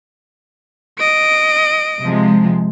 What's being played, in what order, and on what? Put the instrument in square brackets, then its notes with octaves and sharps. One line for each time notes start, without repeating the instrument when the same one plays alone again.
[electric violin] D#5 D7
[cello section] C3 F3 G#3